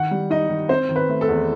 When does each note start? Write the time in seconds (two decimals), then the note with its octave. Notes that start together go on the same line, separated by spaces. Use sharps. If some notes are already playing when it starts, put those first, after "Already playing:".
Already playing: D#3 F#5
0.11 G3
0.30 D#4 D#5
0.49 D#3
0.69 C4 C5
0.89 D#3
0.96 B4
1.09 A3
1.21 A4
1.28 E2